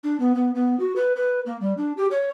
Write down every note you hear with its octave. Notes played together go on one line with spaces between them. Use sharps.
D4
B3
B3
B3
F#4
B4
B4
A#3
G3
D4
G4
C#5